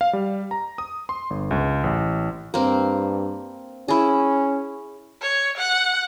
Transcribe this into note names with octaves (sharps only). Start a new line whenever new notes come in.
F5
G3
A#5
D#6
C6
G1
C#2
A1
G2 A#3 C4
C#4 E4 G#4
C#5
F#5